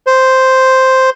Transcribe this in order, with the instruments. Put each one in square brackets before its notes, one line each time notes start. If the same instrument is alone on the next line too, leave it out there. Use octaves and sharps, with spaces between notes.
[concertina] C5